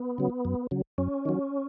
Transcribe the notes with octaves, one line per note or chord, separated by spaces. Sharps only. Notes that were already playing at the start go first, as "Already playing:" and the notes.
Already playing: B3
C#3 F#3
F#2
C#3 F#3
F#2 C#4
D#3 F#3